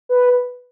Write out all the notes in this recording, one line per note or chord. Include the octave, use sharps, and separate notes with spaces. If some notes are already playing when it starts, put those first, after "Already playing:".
B4